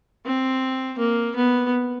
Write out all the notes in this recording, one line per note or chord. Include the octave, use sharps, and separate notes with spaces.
C4
A#3
B3